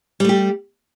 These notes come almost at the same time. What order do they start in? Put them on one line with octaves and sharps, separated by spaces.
G3 A3 G4